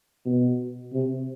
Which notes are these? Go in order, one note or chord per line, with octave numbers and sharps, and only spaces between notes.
B2
C3